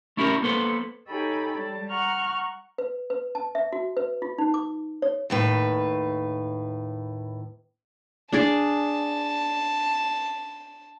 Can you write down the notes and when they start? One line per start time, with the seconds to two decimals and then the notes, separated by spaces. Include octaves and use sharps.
0.17 A3 C#4 E4 G4 G#4 A#4
0.42 A#3 B3 A4 B4 C5
1.07 D#4 G4 A4 C#5 G#5 B5
1.55 G3 A5
1.90 F#5 A#5 C#6 F6 F#6
2.78 B4
3.10 B4
3.35 A5
3.55 E5
3.73 F#4
3.97 B4
4.22 F4
4.38 D#4
4.54 D6
5.02 C#5
5.30 D#2 A2 B4
8.32 D4 G#4 D5 A5